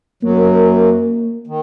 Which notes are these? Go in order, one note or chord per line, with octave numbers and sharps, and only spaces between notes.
F#2 F#3 A#3
D#3